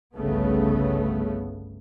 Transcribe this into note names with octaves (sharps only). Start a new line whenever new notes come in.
G1 C2 C#3 A3 B3